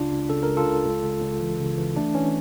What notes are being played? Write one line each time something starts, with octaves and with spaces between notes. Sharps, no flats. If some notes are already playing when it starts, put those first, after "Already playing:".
Already playing: C#2 C#3 D4 F4
C#2
C#3 A4
C#2 A#4
F4 A4
C#2
C#2
C#2
C#2
E3
C#3
E3
A3 D4
E3 C#4